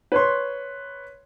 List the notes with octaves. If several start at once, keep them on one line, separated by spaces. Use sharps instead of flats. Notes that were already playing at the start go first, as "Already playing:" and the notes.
B4 C#5 C6